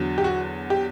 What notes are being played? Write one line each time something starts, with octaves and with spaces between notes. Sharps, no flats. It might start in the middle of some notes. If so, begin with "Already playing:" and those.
Already playing: E2 D3 F#3
G4
F#4
G4